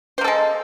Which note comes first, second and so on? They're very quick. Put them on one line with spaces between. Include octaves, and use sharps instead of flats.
C5 A#3 A4 G#3